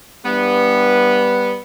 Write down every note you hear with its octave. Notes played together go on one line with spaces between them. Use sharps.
G2 E3 G3 B3